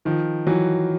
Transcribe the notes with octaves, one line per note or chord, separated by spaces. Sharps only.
D#3 F3
E3 F#3